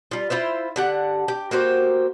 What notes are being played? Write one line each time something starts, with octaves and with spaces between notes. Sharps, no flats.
G3 F4
E4 F4 C5 E5
D3 G4 F#5
G4
A#3 F#4 G4 C5